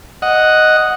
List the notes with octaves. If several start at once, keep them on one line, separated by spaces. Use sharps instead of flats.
D#5 F#5